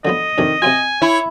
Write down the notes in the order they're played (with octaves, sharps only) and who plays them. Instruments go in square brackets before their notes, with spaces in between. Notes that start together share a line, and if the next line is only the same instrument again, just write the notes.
[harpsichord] D3 F3 B3 [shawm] D#5
[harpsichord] F2 C3 D4 [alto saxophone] D#3
[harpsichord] C3 C4 F4 [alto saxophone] G#5
[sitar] E4 [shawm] C#5